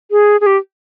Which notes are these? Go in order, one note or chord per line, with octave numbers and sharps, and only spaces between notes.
G#4
G#4
G4